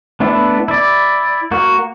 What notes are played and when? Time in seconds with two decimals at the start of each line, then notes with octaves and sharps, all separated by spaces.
0.20 A3 B3 D4 E4
0.68 E4 D5
1.51 A#3 F#4